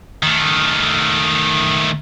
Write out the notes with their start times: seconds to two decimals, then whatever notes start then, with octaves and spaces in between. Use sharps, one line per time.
0.23 D#3 A3